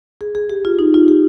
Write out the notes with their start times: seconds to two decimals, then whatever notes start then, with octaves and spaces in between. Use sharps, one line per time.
0.21 G#4
0.35 G#4
0.50 G4
0.65 F4
0.79 D#4
0.94 F4
1.08 G4